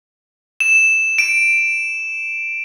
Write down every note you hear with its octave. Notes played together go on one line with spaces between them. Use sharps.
E7
D7